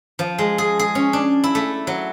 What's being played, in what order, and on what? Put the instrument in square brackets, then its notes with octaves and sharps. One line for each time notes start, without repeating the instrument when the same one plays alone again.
[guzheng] F3
G#3
G#4
G#4
C#4
D4
E4
A3
F#3